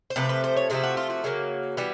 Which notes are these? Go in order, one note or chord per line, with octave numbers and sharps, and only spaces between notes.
C5
C3 F3 A3 B4
B4
C5
C#5
C3 F3 A3 G#4
F#4
F4
F#4
C#3 F#3 A#3
E3 G3 B3